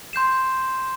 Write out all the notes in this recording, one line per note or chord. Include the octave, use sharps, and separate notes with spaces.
C6 G6 C7 E7